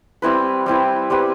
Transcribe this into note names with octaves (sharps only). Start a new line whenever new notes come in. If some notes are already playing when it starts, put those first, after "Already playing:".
G3 C4 E4 B4
G3 C4 E4 B4
G3 C4 G4 B4